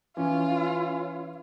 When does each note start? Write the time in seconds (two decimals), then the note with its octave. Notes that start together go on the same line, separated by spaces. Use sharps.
0.17 E3 C#4 F4